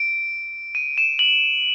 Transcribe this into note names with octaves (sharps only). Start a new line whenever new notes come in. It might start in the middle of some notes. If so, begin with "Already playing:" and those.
Already playing: D7
D#7
E7
F#7